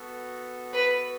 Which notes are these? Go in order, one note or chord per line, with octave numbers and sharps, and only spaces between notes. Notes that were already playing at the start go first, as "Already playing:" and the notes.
Already playing: B3 F#4 A4
B4